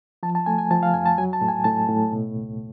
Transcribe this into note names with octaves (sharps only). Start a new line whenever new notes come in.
F3 A5
A5
A3 G#5
G#5
F3 A5
F5
F2 G#5
A5
F#3 G#5
A5
A2
G#5
A2 A5
A2
B2
C#2